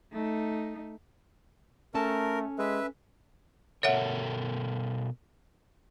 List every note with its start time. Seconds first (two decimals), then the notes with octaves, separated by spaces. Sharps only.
0.12 A3 D#4
1.94 A3 C#4 A4 A#4 A5
2.59 G#3 B4 E5
3.83 B2 A4 A#4 C#5 E5 F#5